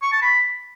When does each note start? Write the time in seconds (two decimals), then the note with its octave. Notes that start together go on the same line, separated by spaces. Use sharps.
0.02 C#6
0.12 A5
0.22 B5